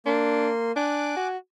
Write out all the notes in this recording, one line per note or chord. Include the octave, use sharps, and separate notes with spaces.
A#3 D4 C6
D4 G#5 D6 F#6
F#4